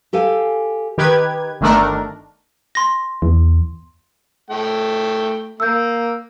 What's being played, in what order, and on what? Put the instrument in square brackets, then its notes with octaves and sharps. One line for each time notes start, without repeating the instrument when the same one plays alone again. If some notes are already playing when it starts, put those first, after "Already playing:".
[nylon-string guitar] G4 A4 F5 G#5
[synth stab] D#3 G4 B4 G#6
G1 D#3 A3 D4 A#4
[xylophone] C6 A#6
[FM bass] E2
[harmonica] A3 G5
[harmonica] A#3 [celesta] E6 G6